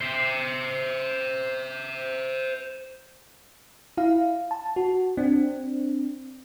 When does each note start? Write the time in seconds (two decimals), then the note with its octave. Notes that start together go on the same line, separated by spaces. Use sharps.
0.01 C5 E5
3.97 E4 F5
4.51 A5
4.76 F#4
5.17 C4 D4